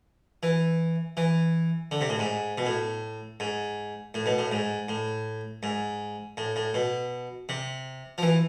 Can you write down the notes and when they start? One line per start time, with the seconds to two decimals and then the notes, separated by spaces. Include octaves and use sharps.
0.43 E3
1.17 E3
1.91 D3
2.01 C3
2.09 A2
2.19 G#2
2.58 B2
2.66 A2
3.40 G#2
4.14 A2
4.26 B2
4.38 A2
4.52 G#2
4.88 A2
5.63 G#2
6.37 A2
6.56 A2
6.74 B2
7.49 C3
8.18 F3
8.23 E3